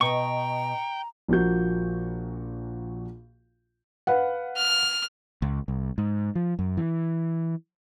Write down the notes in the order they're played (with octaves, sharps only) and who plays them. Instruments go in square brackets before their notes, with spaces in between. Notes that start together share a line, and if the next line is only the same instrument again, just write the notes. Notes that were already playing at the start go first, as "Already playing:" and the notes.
[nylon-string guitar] B2 D#5 [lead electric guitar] G5 [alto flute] A#5 [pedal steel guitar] C#6
[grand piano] A#1 A#2 F3 A#3 F#4 G6
[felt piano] B4 F5 F#5
[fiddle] F6
[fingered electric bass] C#2
C2
G#2
F3
F#2
E3